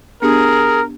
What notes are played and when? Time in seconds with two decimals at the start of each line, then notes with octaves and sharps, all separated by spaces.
0.22 B3 D4 G4 G#4 A#4